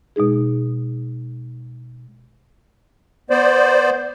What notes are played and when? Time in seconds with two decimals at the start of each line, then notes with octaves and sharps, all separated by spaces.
0.16 B2 G#3 D#4 G#4
3.30 B3 C5 D5